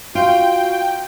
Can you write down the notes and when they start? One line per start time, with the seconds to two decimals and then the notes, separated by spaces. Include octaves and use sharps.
0.15 F4 F#4 G5